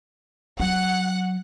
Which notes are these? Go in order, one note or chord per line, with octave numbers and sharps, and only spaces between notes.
F#3 F#5